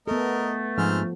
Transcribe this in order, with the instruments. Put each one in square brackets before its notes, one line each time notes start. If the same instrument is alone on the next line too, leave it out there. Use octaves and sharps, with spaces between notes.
[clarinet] A3 [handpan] B3 A4 [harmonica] A#4 D#5
[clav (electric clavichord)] G#2 [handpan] F3 [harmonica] C4 G#5 F6